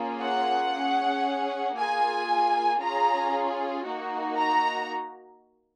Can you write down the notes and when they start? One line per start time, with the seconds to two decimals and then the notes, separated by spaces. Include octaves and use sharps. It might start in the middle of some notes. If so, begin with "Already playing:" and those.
Already playing: A#3 C#4 F4 G#4
0.21 F#5
0.73 C#4 G#4
1.77 A#3 F4 G#4 G#5
2.81 C#4 F4 G#4 A#5
3.86 A#3 D#4 F#4
4.39 A#5